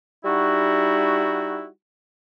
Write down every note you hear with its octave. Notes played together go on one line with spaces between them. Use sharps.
G3 D#4 E4 F#4